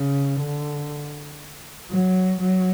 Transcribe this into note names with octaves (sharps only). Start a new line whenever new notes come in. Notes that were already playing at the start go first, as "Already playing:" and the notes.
Already playing: C#3
D3
F#3
F#3